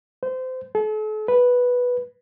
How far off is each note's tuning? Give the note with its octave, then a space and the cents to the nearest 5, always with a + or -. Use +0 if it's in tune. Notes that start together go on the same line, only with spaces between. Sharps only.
C5 -25
A4 -40
B4 -5